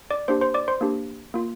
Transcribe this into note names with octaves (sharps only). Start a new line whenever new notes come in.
D5 D6
A#3 D4 G4 C5 C6
C5 C6
D5 D6
C5 C6
A#3 D4 G4
A#3 F4